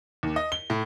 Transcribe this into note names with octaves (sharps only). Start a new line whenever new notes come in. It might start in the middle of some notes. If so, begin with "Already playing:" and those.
D#2
D#5
G7
A2